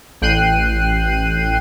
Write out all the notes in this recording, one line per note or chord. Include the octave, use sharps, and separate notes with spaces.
A1 G5 F#6 C7 D#7